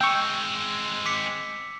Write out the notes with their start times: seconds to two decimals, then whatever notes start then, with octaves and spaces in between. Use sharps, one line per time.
0.01 G#3 C4 G5 C#6 E6
1.06 D6 B6 C#7